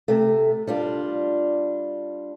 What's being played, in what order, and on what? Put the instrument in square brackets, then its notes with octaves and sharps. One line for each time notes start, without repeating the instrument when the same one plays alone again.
[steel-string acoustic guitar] C3 A3
G3 D4 F4